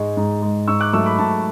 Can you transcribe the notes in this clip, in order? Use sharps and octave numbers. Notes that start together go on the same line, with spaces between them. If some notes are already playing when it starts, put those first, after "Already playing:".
Already playing: G#2 G#3 C#6
G#2
G#3
G#2 C#6 E6
D6 F#6
F#3 A3 C#6 E6
B5 D6
G#2 A5 C#6